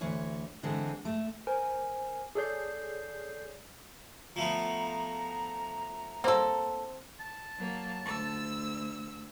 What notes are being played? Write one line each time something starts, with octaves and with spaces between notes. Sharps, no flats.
D2 E3 C#5
D3 E3 G#3 C4
A3
A#4 C5 G#5
G#4 A4 C#5 D5 G6 C7
F3 A3 B3 A#5
A#3 C4 A4
A5
F#3 A#3
D2 E6